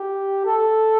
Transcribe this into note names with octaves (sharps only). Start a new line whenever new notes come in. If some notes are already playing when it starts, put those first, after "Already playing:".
Already playing: G4
A4